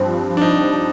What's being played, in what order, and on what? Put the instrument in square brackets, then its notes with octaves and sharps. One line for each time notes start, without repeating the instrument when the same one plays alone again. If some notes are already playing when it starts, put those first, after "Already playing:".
Already playing: [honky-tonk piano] G2 F3 C4
[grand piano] D4
D#4